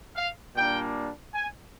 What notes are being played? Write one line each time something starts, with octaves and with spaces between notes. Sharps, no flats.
F5
A#2 G3 A#3 D4 G5
G#5